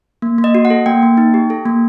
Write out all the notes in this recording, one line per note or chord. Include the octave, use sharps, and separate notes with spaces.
A#3
A#3
D#5
F#4
F#5
A4
A#3 G5
A#3
D#4
G4
A4
A#3